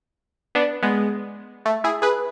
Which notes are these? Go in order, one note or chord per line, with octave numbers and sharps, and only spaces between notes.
B3 D4
G#3 B3
A3
E4 G#4
G#4 B4